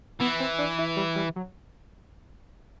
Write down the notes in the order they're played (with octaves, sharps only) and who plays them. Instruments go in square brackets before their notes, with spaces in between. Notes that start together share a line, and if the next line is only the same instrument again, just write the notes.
[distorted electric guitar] E3 [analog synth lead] B3
[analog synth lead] C4
D4
E4
G3
G3
F#3